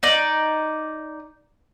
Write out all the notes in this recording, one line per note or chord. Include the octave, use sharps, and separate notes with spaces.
D#4 D5